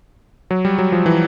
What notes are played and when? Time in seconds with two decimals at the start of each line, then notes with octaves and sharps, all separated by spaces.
0.51 F#3
0.65 G3
0.79 F#3
0.92 F3
1.06 E3